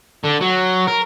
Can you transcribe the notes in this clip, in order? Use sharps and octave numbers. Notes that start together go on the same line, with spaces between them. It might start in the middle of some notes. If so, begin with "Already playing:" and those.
D3
F#3
A#4